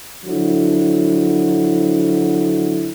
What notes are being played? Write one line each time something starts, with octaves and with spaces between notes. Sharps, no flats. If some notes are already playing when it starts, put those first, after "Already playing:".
D3 F3 F#3 E4